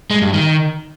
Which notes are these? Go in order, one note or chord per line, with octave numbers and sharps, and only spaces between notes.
G#3
G2
D#3